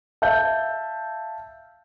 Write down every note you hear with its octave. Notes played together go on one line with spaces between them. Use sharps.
E5 F5 A5 G6